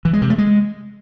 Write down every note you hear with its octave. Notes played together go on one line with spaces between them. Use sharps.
E3
G#3
C3
A3
G#3